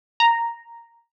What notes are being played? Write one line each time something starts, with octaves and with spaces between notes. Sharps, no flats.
A#5